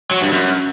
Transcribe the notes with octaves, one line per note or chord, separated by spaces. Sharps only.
F#3
G2
F#2